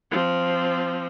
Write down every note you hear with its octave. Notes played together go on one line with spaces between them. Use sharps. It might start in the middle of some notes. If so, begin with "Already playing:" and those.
F3 C4